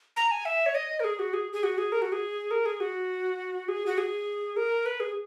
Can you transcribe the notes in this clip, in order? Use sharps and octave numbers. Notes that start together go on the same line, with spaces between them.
A#5
G#5
E5
C#5
D#5
A#4
G#4
F#4
G#4
G#4
F#4
G#4
A#4
F#4
G#4
A#4
G#4
F#4
G#4
F#4
G#4
A#4
B4
G#4